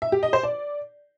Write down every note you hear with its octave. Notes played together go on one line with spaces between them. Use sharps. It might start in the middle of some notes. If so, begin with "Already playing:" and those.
E5
G4
D#5
C5
D5